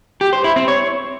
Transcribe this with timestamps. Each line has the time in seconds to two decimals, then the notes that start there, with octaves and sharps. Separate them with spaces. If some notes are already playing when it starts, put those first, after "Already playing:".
0.21 G4
0.33 C5
0.44 E4
0.56 C4
0.68 C#5